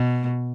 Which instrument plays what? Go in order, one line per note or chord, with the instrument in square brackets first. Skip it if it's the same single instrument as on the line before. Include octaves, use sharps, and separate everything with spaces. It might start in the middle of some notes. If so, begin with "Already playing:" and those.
Already playing: [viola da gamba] B2